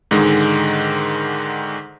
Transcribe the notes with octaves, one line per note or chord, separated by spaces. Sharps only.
G#2 D3 D#3 G#3